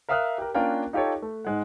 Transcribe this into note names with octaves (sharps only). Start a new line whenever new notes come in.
A#4 E5 F5 D#6 F6 F#6
G4 A#4
A#3 C#4 D4 F4 A#4 G5
D#4 F4 G4 A4 C#5
A3
G#2 G#3 F#5